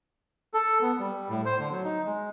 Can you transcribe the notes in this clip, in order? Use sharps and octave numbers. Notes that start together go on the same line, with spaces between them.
A4
B3
G3
A2
C5
D3
F#3
D#4
G#3